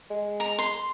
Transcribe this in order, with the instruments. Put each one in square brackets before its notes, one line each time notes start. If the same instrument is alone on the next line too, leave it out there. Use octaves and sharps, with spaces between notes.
[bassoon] G#3
[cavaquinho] A#5
C6